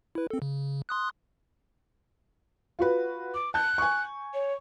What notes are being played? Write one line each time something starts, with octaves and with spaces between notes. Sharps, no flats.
E4 B4
C4 A4
C#3
C6 D#6 F#6
F4 F#4 B4
D6
A5 F#6 G6
G#5 C#6
C#5